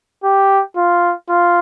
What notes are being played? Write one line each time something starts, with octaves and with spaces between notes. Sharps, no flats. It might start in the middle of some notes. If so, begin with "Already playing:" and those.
G4
F4
F4